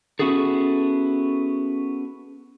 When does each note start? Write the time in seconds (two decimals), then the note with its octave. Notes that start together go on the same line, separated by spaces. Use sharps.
0.19 B3 C#4 E4 F#4 G#4 A4